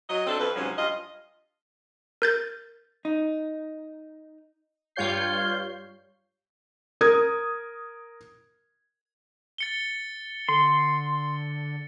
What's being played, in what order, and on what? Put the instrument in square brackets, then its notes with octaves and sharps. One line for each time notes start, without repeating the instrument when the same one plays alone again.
[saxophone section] F#3 D#5
C4 D4 A4
F2 B4
G#2 C3 F3 F#3 C#4
G2 F4 D#5
[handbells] A#4 G6 A6
[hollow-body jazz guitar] D#4
[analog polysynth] G2 G3 F4 C#5 G6 C7
[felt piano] A#4 D#6 G#6
[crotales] A6 C#7 G7
[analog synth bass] D3 [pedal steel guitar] C6